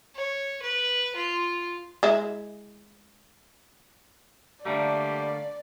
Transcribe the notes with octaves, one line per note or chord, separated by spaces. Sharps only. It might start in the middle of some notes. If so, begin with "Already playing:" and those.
C#5
B4
F4
G#3 E4
D3 G3 A3 A#3 D5